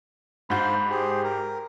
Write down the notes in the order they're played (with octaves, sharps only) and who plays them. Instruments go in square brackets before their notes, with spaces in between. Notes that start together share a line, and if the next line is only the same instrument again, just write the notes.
[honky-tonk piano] G#2 F#4 G6 [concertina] C5 F5 A5 [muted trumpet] B5
[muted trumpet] G4 [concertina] G#4 C5
[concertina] A#4